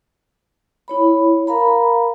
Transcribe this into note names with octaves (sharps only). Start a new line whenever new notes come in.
E4 C#5 B5
A#4 F5 A#5 B5